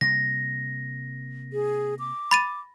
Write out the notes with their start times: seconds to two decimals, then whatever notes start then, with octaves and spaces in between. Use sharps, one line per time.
0.01 C3 G3 A#3 A#6
1.53 G#4
1.99 D6
2.31 B5 A6 D#7